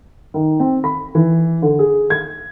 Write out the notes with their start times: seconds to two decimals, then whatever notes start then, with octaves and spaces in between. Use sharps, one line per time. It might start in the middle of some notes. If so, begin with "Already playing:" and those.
0.34 D#3
0.60 C4
0.84 B5
1.15 E3
1.62 D3
1.79 G#4
2.10 G#6